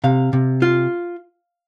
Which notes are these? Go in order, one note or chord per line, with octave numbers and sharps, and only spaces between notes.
C3 F5
C3
F4